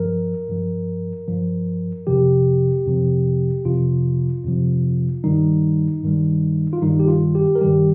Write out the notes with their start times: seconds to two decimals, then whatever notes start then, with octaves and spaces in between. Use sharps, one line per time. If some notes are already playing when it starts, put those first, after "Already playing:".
Already playing: G2 F3 A#4
0.49 G2 F3
1.28 G2 F3
2.07 F2 C3 F3 G4
2.86 F2 C3 F3
3.65 F2 C3 F3 F4
4.44 F2 C3 F3
5.24 G2 D#3 G3 D#4
6.03 G2 D#3 G3
6.73 F4
6.82 G2 D#3 G3 D#4
7.00 G4
7.08 F4
7.35 G4
7.55 A#4
7.61 G2 D#3 G3 G4